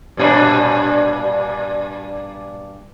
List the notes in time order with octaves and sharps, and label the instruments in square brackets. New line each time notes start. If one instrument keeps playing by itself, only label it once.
[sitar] G2 A#2 D4